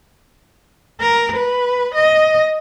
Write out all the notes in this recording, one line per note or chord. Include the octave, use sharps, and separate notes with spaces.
A#4
B4
D#5